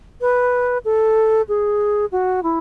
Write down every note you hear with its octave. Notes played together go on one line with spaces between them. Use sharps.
B4
A4
G#4
F#4
E4